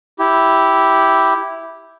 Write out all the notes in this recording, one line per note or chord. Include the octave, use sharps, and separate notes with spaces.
E4 G4